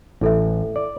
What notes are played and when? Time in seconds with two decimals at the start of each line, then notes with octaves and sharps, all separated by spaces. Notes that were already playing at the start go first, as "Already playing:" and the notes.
0.21 A1 E4 A4 E5
0.76 D5